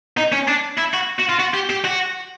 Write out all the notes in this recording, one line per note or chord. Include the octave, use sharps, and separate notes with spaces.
D#4
C#4
D4
E4
F#4
F#4
F4
F#4
G4
G4
F#4